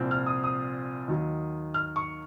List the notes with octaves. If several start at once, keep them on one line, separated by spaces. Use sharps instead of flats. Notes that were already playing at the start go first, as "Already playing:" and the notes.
Already playing: C2 A#2 F3 C4
F6
D#6
D#6
D#2 D#3 F#3
F6
C#6